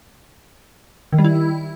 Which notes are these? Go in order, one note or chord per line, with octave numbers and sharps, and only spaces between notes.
D#3
G3
E4